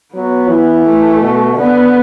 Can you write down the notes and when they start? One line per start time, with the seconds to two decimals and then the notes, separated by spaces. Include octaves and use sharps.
0.14 F#3 B3
0.49 E3
0.85 A3
1.21 B2
1.56 D3 B3